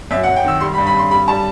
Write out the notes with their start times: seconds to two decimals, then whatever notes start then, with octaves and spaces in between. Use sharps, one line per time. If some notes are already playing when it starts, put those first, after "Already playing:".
0.11 F#2 E5
0.23 F#5
0.28 F#2
0.36 G5
0.44 D#3 E6
0.61 G3 C6
0.73 B5
0.78 G2
0.87 B5
0.94 G2 C6
1.11 G3 B5
1.28 G3 A5